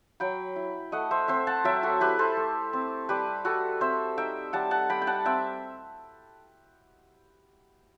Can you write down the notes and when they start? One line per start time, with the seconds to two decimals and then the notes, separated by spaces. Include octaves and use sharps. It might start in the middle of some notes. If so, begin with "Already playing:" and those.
0.20 F#3 G5 B5
0.56 E4
0.92 A3 D#5 F#5
1.11 C5 E5
1.28 C4 C5 E5
1.47 F#5 A5
1.64 F#3 E5 G5
1.83 F#4 A4
2.00 E4 G4 B4
2.19 A4 C5
2.37 A3
2.73 C4
3.09 G3 G4 B4
3.45 G3 F#4 A4
3.81 C4 C5 E5
4.17 D#4 E5 G5
4.53 G3 F#5 A5
4.71 F#5 A5
4.90 G3 G5 B5
5.02 G5
5.07 F#5 A5
5.25 C4 E5 G5